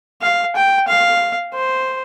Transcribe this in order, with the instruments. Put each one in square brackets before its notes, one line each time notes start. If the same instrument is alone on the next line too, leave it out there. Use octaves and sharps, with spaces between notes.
[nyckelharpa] F5
G5
F5
C5